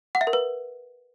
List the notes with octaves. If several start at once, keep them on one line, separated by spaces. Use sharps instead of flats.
F#5
E5
A#4
B4